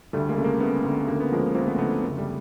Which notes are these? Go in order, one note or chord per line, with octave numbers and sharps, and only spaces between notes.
D2 G3 A3
G#3 A#3
C#3 A3
G#3 A#3
C#3 A3 B3
D2
D2 A#3
B3
F3 G#3 A#3
F3 A#3 C4
A3 B3
D2 A3 B3
F#1
G3 A3